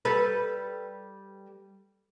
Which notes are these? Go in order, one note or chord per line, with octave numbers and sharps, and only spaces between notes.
G3 A4 B4